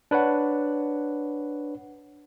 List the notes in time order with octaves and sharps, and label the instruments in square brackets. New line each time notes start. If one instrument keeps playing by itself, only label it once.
[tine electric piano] D4 B4 C#5 F#5